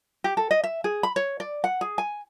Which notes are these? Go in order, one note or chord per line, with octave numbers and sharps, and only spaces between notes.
G4
A4
D#5
E5
G#4
B5
C#5
D5
F#5
G#4
G#5